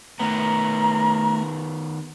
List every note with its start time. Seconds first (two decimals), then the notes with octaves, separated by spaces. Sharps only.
0.19 D#3 A3 B3 A#5